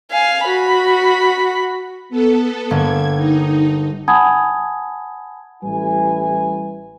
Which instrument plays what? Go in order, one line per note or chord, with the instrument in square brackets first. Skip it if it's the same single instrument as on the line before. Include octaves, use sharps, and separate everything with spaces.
[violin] F5 G#5
F#4 B5
[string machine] B3 A4
[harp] G1 A#3 [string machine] G#6
[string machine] D#4
[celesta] F#5 G#5 A5 B5 D#6 G#6
[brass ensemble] A1 G3 E4 B4 G#5